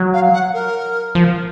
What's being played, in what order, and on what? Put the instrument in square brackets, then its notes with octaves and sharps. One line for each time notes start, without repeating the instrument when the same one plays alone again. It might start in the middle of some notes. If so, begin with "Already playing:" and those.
Already playing: [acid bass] F#3
[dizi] F5
F#5
A#4
[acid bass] F3